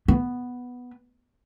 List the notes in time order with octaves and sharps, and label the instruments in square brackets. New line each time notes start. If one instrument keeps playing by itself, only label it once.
[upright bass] B3